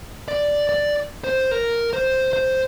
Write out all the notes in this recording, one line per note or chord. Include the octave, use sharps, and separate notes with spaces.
D5
D5
C5
A#4
C5
C5